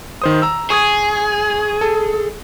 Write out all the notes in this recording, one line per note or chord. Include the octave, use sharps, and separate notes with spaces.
D#3 C5 D#6
A#5 E6
G#4 C#6 D#6 G#6
A4